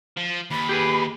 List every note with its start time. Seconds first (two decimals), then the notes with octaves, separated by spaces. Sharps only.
0.17 F3
0.51 D#2 B5
0.69 G4 G#4 B4